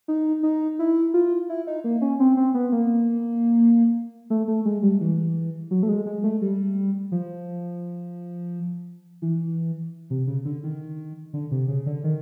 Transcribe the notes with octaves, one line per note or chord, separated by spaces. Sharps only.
D#4
D#4
E4
F4
E4
D#4
A#3
C#4
C4
C4
B3
A#3
A3
A3
G#3
G3
E3
F#3
A3
G#3
G#3
A3
G3
F3
E3
C3
C#3
D3
D#3
D3
C3
C#3
D3
D#3